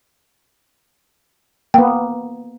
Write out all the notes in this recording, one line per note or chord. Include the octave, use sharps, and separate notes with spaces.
A#3 B3 G5